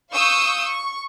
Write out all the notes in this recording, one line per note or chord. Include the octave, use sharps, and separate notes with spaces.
F5 C#6 D#6 E6 G6
C#6